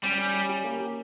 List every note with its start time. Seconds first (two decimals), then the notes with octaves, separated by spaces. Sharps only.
0.03 G3 C#4
0.18 C#5
0.34 E5
0.49 G4
0.64 A#3
0.79 G4